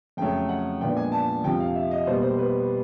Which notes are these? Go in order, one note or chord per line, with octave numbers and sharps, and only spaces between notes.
F2 C#3 F#3 A3 G5
F#5
A#2 F3 G#3 B3 D4 G5
G#5
A5
F2 C3 F3 G5
F5
E5
D#5
B2 G3 A#3 C5
C5
B4